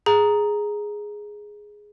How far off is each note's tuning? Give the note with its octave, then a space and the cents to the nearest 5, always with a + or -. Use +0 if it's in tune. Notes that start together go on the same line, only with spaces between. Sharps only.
G#4 +0 A#5 +0